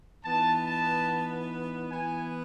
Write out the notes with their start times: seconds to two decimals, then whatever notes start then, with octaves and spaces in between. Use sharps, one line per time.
0.23 E3 B3 D#4 A5
0.66 A5
1.91 E3 B3 E4 G#5